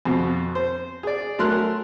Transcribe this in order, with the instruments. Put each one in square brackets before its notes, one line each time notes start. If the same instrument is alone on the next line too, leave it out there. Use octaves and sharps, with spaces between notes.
[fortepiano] F2 B2
C5
G#4 D5
F#3 A3 A#4 C6 F#6